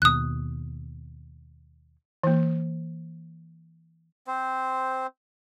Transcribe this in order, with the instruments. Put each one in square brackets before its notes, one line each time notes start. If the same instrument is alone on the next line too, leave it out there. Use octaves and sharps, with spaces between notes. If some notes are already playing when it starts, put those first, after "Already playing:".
[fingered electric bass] D#2 B2 [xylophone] D#6 F#6
[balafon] E3 A#3
[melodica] C4 C5